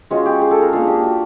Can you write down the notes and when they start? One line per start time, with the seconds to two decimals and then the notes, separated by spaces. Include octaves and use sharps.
0.10 G#3 C#4 F4 F#4
0.26 G4
0.42 G#4
0.51 A4
0.62 A#4
0.73 A#3 D4 F4 G#4
0.87 G4
1.04 F#4